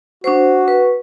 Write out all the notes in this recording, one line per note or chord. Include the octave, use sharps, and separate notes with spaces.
D4 F#4 C5
B4